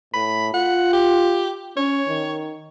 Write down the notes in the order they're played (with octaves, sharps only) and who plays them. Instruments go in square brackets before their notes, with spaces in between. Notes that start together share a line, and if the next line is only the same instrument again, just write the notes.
[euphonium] A2 [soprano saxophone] B5
[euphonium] F4 [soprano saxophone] F#5
[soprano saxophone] G4
[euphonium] C#4 [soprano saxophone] C#5
[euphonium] D#3